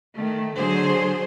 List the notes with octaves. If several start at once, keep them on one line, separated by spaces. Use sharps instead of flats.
D#3 A3
D3 F#3 G#4 C5